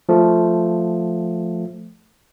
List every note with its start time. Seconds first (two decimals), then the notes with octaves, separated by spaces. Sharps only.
0.09 F3 A3